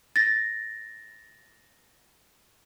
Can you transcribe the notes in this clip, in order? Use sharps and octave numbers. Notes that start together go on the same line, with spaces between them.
A6 A#6